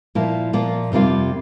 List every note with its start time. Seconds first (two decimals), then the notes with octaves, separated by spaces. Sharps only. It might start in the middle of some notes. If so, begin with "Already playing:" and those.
0.15 A#2 F3 A#3 E4
0.53 A#2 F3 A#3
0.92 F2 C3 G3 A#3 F4